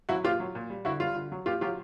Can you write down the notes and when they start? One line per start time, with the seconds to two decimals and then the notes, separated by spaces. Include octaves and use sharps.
0.09 F#3 E4 F#4
0.24 A#2 F4 G4
0.40 F#3
0.55 A#2
0.70 G3
0.85 D3 E4 F#4
1.00 G3 F4
1.16 D3
1.32 F#3
1.46 A#2 F4 G4
1.61 F#3 F4 G4